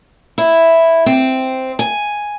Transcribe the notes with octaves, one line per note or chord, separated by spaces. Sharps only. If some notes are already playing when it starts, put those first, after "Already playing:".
E4
C4
G#5